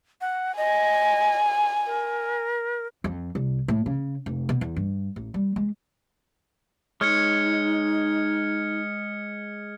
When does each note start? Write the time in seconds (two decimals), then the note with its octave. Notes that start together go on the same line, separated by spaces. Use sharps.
0.21 F#5
0.57 D#5 G#5
1.86 A#4
3.04 F2
3.35 C2
3.68 A2
3.86 C#3
4.26 F1
4.49 B2
4.61 E2
4.76 G2
5.16 A1
5.34 G3
5.56 G#3
7.01 G#3 D#4 C#5 F6 G#6 C#7